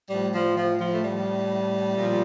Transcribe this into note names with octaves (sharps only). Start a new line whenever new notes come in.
A2 F3 G3
F3
F3
F3
A3
G3
A#2 F3